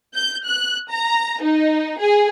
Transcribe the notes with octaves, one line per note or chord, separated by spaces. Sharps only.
G6
F#6
A#5
D#4
G#4